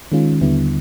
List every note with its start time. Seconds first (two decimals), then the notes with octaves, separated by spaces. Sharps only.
0.12 D#3 G#3 C#4 F4
0.41 D#2 D3 G3 B3 E4